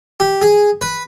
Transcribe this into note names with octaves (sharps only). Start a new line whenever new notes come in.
G4
G#4
B4